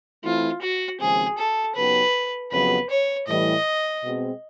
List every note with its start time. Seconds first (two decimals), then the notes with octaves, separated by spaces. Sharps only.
0.24 E3 A3 C4 E4 F4
0.62 F#4
1.00 D#2 C#3 F3 G#3 C4 G#4
1.38 A4
1.75 C#3 F#3 B3 D#4 G4 B4
2.52 F2 C#3 F#3 B3 B4
2.90 C#5
3.28 A2 E3 G3 D#5
4.04 B2 G#3 C4